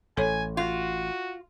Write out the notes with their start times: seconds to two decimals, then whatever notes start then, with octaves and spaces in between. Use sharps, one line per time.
0.17 A1 A4 C#5 G#5
0.57 F4 F#4